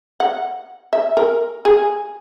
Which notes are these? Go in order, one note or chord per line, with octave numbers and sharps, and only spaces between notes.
F#5
E5
A#4
G#4